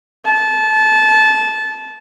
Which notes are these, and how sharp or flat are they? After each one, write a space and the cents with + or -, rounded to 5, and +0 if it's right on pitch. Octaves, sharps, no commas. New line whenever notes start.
A5 -20